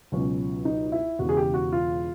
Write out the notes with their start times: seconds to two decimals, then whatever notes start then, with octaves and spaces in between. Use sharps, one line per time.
0.12 C#2 B2 F#3 C#4
0.65 D#4
0.92 E4
1.19 E1 E2 C#3 F#4
1.29 G#4
1.37 G4
1.54 F#4
1.72 F4